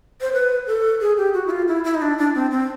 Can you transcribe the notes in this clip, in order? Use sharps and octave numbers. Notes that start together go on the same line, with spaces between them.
C5
B4
A4
G#4
G4
F#4
E4
F4
E4
E4
D#4
D4
D4
C4
C4